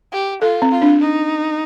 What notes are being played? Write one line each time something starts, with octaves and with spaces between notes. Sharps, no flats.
G4
F4 A4
C4
F4
D4
D#4